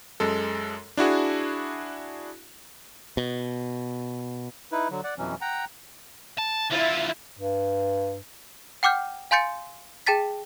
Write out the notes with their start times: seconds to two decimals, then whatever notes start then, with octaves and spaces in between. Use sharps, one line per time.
0.20 F#2 G#3 A4
0.97 D4 E4 F#4 G#4
3.17 B2
4.72 D#4 E4 B4
4.90 D3 F#3
5.04 D5 F#5
5.18 F2 B2 E3 F#3 C#4
5.41 F#5 G5 A#5
6.38 A5
6.71 D3 E4 F4 E5
7.39 G2
8.83 F#5 G5 D6 F6 G6
9.31 F5 G#5 C6 G6 A6 C#7
10.07 G#4 G5 A5 A6 B6